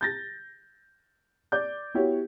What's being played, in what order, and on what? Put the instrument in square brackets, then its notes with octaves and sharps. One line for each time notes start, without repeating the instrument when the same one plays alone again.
[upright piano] G6 A6 A#6
D5 D6 G6
B3 E4 F#4 G4 C#5